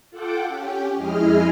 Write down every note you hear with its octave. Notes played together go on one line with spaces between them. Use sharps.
F4 A4 F#5 G5 D6
C#4 G4
F2 G#3 E4 G#4 D#5 F6